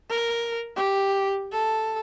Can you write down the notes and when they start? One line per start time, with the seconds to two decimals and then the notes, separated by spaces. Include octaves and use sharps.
0.10 A#4
0.76 G4
1.53 A4